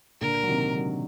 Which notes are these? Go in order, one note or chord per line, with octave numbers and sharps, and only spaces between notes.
A#2 D3 A#4
F#3
C3 D#3
D3 F#3